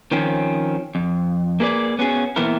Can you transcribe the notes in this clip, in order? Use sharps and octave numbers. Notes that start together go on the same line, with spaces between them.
D#3 F3 C4 C#4
F2
A#3 G#4 B4 D5
B3 C#4 F#4 G#4
A#2 E3 B3 C4 E4 A#4